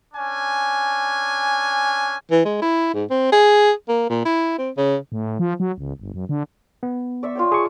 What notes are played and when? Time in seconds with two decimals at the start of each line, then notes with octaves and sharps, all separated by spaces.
0.13 C#4 D4 G#5
2.31 E3
2.45 G#3
2.62 E4
2.94 G#2
3.10 C4
3.32 G#4
3.88 A#3
4.10 A#2
4.25 E4
4.59 C4
4.77 C#3
5.12 A2
5.39 F3
5.60 F#3
5.78 C#2
5.99 G1
6.14 F#2
6.29 D3
6.83 B3
7.23 D5 E5 C#6
7.35 F4 C#5 G5
7.52 G#4 A5 C#6